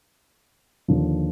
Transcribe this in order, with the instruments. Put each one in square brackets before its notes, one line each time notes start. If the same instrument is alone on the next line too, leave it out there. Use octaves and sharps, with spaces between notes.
[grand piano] D#2 D3 F3